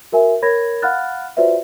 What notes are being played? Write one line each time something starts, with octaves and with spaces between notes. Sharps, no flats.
F#4 A#4 E5 G#5
A#4 C#5 B5 G#6 A#6
F5 F#5 B5 F6 F#6 A6
F4 F#4 B4 C5 D5 E5